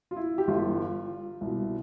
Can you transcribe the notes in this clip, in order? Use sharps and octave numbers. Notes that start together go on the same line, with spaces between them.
F4
E4
G4
G1 G2 E3 F4
C2 B2